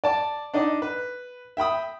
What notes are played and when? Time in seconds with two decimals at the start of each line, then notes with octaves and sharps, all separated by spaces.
0.04 D5 A5
0.54 D4 D#4 D#5
0.82 B4
1.57 E5 G5 B5 D#6